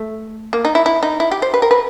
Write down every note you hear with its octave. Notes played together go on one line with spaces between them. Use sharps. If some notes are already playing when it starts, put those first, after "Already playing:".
Already playing: A3
A#3
D#4
E4
E4
D#4
E4
G4
C5
B4
A#4
B4